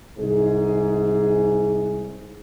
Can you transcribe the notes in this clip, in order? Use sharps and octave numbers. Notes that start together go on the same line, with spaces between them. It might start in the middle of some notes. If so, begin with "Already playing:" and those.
C2 G#2 G#4